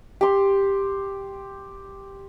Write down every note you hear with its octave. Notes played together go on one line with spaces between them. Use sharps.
G4 C6